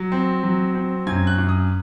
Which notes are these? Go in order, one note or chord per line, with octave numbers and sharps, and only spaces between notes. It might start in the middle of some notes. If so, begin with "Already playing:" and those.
Already playing: F#3
C4
F#3
C4
F#2 G#6
F#6
F#2
D#6